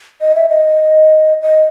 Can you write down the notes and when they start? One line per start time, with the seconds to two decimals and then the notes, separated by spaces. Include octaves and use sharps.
0.21 D#5
0.35 E5
0.49 D#5
1.42 D#5